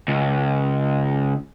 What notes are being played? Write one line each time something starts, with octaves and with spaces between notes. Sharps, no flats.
C#2